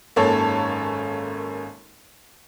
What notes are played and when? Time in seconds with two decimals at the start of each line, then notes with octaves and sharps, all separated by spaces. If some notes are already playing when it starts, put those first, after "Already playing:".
0.16 G#1 F#2 A#3 A4 C#5 A5